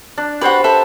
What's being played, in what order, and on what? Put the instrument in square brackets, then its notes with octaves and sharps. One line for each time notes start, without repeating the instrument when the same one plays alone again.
[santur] D4
[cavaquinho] F#4 B4 [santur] G4 C5 F#5
[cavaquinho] A4 B4 E5